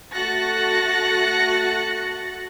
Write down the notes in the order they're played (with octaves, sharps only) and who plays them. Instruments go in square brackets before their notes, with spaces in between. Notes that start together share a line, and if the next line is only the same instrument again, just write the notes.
[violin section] A3 F#4 F#6 A6 A#6 C#7